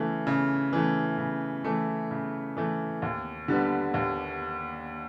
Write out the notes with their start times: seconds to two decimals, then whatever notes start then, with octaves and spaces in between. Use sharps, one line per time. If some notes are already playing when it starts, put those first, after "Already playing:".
Already playing: C#3 E3 A3
0.27 C#3
0.73 E3 A3
1.18 C#3
1.64 E3 A3
2.11 C#3
2.57 E3 A3
3.02 D#2
3.48 D3 G3 B3
3.94 D#2